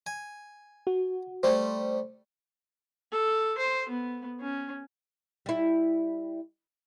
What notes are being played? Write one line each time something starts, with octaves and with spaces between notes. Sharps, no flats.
G#5
F#4
G3 A3 C5
A4
C5
B3
C#4
G3 E4